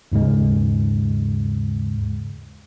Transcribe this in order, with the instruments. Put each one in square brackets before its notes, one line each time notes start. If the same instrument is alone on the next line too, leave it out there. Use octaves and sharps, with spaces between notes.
[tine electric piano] D#2 G#2 C#3 G#3